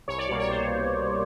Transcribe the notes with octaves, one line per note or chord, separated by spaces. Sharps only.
C2 C#5
D5
B2 G3 A#3 D5
C#5
C5